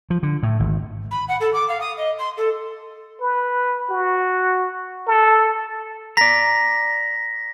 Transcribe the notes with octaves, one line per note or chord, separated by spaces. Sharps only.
F3
D3
A2
G#1
B5
F#5
A4
D6
F5
D#6
D#5
C6
A4
B4
F#4
A4
D5 A#5 A#6 B6